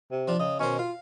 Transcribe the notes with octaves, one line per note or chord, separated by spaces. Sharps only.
C3
F3 D4 F4
C#3 D#5
B2 D#3 C#4 C5
F4 F5